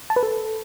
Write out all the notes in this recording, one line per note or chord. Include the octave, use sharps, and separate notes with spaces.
A5
B4
A4